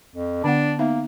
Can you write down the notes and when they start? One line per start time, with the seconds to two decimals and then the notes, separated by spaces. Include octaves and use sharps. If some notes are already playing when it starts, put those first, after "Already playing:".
0.15 F2
0.44 D3 B3 D4 F#5
0.79 A#3 B3 D#4 E5